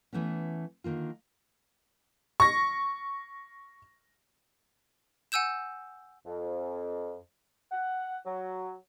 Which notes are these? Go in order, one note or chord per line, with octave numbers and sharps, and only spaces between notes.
E3 A3 B3 C#4
D3 D#3 A#3 F4
C#6 A#6
F#5 G#5 E6 G6 E7
F2
F#5
F#3